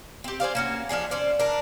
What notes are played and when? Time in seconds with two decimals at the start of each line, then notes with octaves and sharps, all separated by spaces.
0.24 C4 G4
0.40 G#4 C5 D5 F5
0.55 A#3 C#4 F#4
0.89 F3 D4 D#4 G#4
1.11 C#4 C5 D5
1.39 D4 A#4